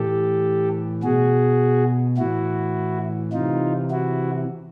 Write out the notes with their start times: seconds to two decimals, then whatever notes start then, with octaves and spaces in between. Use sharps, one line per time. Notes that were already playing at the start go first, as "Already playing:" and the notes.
Already playing: A2 E3 G4 A4
1.03 B2 F#4 G#4
2.18 A2 E3 E4 F#4
3.33 C3 E3 D#4 F4
3.90 E4 F#4